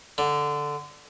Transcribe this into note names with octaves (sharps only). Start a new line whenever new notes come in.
D3